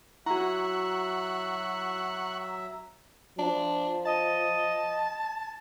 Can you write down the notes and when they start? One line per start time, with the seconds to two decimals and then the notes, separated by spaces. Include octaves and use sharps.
0.26 F#3 E4 F#4 E5 F#5 A#5 C#6
3.38 F3 D4
4.05 D#5 A5